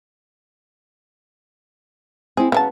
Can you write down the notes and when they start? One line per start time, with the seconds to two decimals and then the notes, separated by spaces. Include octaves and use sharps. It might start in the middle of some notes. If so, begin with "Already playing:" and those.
2.37 C4 E4 G#4
2.52 C#3 F#3 B3 A5